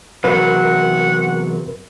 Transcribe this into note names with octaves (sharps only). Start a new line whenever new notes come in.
E2 C3 F#3 A#4 B4 F#5